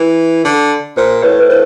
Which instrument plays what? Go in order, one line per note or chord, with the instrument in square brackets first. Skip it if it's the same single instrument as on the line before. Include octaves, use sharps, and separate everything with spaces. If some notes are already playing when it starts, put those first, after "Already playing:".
Already playing: [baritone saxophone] E3
D3
[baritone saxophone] A#2 [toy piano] C5
[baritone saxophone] A2 [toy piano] B4 C#5
[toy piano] B4
[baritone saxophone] A2 [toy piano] C5